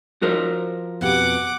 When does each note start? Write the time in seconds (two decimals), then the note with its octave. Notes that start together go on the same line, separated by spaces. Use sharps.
0.22 F3 F#4 A#4 C5
1.01 F2 B2 G4 F#5 D6